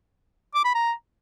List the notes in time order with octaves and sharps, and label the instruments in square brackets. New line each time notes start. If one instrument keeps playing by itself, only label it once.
[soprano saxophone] D6
B5
A#5